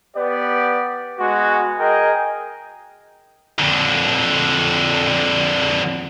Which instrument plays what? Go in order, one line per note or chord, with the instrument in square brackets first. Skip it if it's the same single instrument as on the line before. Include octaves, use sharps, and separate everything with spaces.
[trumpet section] B3 G4 D5
G#3 B3 F#4
G#4 A#4 D#5 G5
[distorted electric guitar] F2 D3